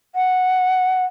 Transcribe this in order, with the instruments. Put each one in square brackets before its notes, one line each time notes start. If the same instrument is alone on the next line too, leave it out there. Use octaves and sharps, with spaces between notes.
[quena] F#5